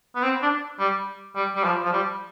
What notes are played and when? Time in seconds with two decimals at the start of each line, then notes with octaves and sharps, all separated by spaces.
0.16 B3
0.23 C4
0.42 D4
0.79 G3
1.36 G3
1.56 G3
1.64 F3
1.85 F3
1.92 G3